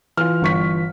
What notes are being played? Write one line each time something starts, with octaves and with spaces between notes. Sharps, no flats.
E3 F4 F6
G1 C#6 B6